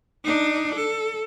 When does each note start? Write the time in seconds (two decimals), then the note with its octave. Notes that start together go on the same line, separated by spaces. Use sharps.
0.24 D4 D#4
0.75 A4